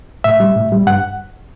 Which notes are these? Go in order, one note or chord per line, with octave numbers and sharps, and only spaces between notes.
A2 E5
G3
A2
G3
G2 F#5